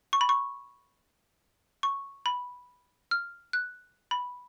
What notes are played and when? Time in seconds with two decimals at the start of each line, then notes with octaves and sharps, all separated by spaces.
0.13 C#6
0.21 B5
0.29 C#6
1.83 C#6
2.26 B5
3.11 F6
3.53 F#6
4.11 B5